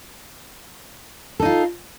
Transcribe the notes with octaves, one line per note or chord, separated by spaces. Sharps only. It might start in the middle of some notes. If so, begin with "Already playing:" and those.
D#4 F4 A4